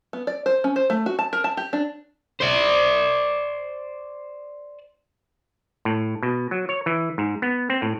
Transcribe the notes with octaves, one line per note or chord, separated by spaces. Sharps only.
B3
D5
C5
C#4
C5
A3
F#4
A5
A#4
A5
G4
D4
C5 D5
A2
B2
F#3
C#5
E3
G#2
B3
C4
A2